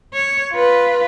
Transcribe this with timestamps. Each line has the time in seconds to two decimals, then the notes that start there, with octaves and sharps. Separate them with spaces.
0.14 C#5
0.53 F4 B4